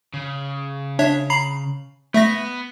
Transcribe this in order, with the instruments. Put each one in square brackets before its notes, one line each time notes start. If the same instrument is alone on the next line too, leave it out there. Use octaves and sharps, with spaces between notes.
[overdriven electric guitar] C#3
[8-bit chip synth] D4 C#5 E5
A#5 B5 C7
[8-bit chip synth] A3 E5 A#6 [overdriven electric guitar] B3